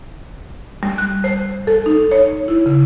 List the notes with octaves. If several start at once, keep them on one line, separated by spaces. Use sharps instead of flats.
G3
F#6
C5
A4
D#4
C#5
E4
C#3